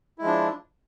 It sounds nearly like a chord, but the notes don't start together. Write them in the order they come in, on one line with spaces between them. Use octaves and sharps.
E4 G#3 F3 D4